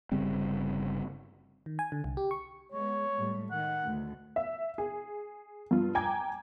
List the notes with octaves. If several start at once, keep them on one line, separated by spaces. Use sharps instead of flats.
G1 C#3 G3 C4
D#3
G#5
D3
C2
G4
C#6
G#3 B3 C#5
A2 G3
D#3 F#5
D2 A2
E5
G#4
G2 F4
G5 G#5 A#5 D6 G#6